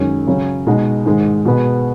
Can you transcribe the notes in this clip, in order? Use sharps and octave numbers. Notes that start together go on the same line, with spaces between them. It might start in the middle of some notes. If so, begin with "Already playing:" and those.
Already playing: F#2 D#3 G#3 C#4
C#3 F#3 C#4
B2 G#3 D#4 F#4
G#2 D#3 G#3
B2 G#3 B3